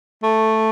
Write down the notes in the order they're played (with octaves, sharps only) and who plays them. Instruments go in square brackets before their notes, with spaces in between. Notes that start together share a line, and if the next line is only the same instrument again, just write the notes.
[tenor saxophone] A3